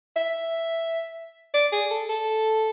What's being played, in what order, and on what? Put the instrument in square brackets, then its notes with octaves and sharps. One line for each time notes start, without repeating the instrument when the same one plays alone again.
[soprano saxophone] E5
D5
G#4
A4
A4